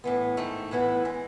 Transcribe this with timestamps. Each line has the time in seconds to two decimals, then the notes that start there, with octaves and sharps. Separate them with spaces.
0.04 A2 E3 B3
0.37 G#2 D#3 A3
0.71 A2 E3 B3 E4 A4
1.05 E3 G#3